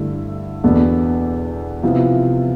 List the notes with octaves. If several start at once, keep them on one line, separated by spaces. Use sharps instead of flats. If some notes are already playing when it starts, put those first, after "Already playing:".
Already playing: G2 D3 A3 E4
E2 B2 B3 D4 A4
C3 F3 B3 E4